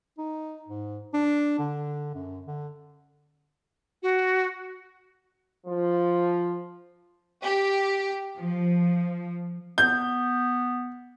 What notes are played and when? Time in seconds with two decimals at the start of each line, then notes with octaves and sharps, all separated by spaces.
0.18 D#4
0.68 G#2
1.14 D4
1.59 D3
2.15 F#2
2.47 D3
4.03 F#4
5.66 F3
7.42 G4
8.37 F3
9.78 B3 G6